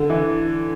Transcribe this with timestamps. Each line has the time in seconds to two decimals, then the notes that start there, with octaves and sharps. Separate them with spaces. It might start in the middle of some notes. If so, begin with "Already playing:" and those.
Already playing: D3
0.10 E3